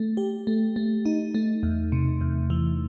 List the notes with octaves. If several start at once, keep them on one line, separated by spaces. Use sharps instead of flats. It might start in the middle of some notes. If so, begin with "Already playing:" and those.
Already playing: A3
G4
A3
A3
D#4
A3
E2
C3
E2
E3